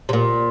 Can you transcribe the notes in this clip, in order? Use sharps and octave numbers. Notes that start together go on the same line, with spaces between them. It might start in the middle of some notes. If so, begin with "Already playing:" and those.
C3
A#2